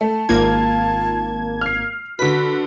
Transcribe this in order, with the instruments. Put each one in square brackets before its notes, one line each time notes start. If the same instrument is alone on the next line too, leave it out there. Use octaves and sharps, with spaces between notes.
[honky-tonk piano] A3 [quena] A5
[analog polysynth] G#1 A#3 G#6 [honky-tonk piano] F4
[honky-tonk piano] F6 C7
[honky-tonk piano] D3 B4 [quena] F#4 [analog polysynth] B6